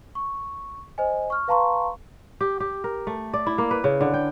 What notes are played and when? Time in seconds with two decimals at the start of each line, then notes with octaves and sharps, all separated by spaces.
0.15 C#6
0.98 C5 D#5 G#5
1.30 C#6 F6
1.48 B4 F5 A5 A#5 C6 C#6
2.41 G4
2.60 G4
2.84 A#4
3.07 A3
3.34 D5
3.47 E4
3.58 A#3
3.71 B4
3.84 C#3
4.01 D3
4.14 G5